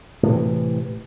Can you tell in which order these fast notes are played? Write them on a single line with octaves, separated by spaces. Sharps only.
A2 C3 E3